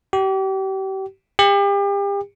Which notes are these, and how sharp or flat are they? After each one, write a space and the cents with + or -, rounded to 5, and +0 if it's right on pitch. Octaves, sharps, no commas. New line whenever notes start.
G4 -35
G4 +35